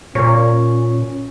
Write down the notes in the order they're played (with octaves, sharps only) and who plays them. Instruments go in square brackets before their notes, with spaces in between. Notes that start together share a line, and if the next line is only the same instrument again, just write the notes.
[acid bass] A#2 [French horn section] C#4 [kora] C#5